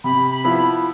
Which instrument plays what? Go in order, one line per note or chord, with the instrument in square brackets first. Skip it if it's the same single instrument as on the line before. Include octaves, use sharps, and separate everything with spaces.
[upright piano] C3 [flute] B5
[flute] B5
[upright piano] F3 B3 E4